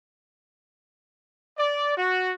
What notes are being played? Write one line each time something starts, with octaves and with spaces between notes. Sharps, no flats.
D5
F#4